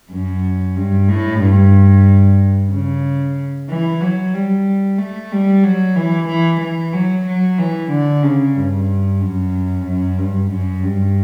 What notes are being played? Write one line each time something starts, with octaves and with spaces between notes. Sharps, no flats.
F#2
G2
A2
G2
C#3
E3
F#3
G3
A3
G3
F#3
E3
E3
E3
F#3
F#3
E3
D3
C#3
G2
F#2
F#2
G2
F#2
G2